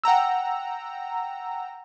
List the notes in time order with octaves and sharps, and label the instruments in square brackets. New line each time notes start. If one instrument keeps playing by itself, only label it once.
[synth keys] F#5 G5 A#5 E6